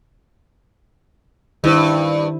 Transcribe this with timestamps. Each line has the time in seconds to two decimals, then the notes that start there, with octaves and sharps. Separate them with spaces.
1.64 G2 D#3 E4 C5